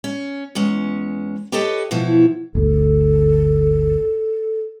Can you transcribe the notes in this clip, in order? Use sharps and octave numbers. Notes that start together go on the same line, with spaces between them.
C#4
E2 G#3 C#4
G4 A4 B4 C#5 D#5 A5
B2 E3 F3 E4
G1 D2 A4